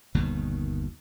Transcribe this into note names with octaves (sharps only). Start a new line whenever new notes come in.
G1 D#2 B2 D#3